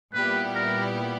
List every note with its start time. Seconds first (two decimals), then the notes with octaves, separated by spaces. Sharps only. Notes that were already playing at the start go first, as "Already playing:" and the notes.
0.14 A#2 G3 B3 E4 G4 B4
0.55 A#4